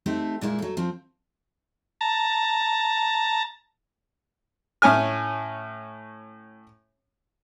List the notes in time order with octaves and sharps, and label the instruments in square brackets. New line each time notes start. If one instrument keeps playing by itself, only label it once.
[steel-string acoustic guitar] A3 C4 D#4 E4 G4 A4
A#2 G#3 A#3 E4
F#3 A4
F3 C4
[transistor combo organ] A5 A#5
[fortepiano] A2 C#4 G#5 F6